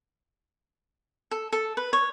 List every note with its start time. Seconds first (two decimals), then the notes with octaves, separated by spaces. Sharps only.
1.31 A4
1.52 A4
1.77 B4
1.93 C#5